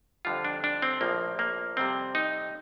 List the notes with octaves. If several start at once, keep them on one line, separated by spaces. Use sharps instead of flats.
F2 D3 G3 F4
D4
D4
C4
A#1 A2 F3 A#3
A#3
F2 C3 G3 C4
D#4